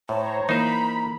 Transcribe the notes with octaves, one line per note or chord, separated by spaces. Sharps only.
A2 C5 C#5 A5 A#5
E3 A#3 D#4 C5 A#5 B5